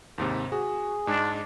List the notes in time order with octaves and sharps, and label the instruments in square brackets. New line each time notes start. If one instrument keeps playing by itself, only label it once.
[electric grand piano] D#2 G#2 C3
[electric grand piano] F#4 [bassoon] G#4
[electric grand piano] G#2 G#3 [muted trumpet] D4